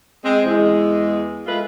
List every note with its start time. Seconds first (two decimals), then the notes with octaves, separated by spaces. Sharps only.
0.24 G#3 C4
0.45 E2 G#3
1.46 G#3 A3 F4 B4